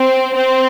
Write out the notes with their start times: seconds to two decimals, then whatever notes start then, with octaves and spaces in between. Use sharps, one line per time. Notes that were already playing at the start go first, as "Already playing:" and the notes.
Already playing: C4
0.36 C4